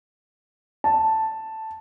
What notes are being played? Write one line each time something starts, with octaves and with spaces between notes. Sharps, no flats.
A5